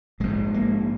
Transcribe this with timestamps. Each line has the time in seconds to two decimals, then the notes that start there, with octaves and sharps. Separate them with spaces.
0.20 A#1 G#2 G#3
0.54 A#3